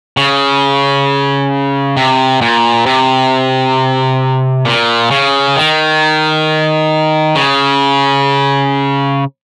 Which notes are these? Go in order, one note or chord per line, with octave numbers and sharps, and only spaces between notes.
C#3
C3
A#2
C3
A#2
C#3
D#3
C#3